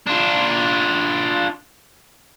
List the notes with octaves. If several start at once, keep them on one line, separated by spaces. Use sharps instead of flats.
D4 F4